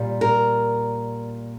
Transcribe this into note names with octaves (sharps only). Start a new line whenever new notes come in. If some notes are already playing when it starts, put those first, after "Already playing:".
Already playing: A#2 G3
A#4